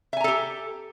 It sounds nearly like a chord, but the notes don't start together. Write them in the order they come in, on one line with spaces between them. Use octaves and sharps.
E5 G#5 A#5 A4 G4